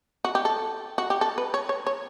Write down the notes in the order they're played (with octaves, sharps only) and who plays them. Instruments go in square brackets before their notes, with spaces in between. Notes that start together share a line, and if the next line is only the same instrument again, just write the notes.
[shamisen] F#4
G4
A4
F#4
G4
A4
B4
C#5
C#5
C#5